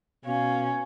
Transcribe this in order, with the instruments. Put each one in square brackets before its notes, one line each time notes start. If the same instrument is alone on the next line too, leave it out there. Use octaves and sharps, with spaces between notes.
[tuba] B2 [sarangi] C#4 [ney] F5